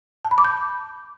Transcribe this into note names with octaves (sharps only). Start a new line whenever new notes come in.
A5
B5
D6
G6